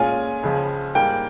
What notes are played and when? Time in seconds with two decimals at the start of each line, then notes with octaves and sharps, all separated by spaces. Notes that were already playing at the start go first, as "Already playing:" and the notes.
Already playing: A#2 G#3 C#4 F4 G#5
0.43 C#2 C#3 F3
0.95 G#2 G3 A#3 G5